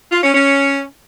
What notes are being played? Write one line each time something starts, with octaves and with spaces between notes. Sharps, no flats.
F4
C#4
C#4